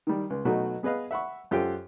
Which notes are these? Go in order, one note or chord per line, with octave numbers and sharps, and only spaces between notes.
D#3 G3
C#2
B2 F#3 A3 D#4 F#4
B3 G#4 B4 D#5 F5
E5 F#5 B5 C#6
F#2 F4 G4 A4 C5 G5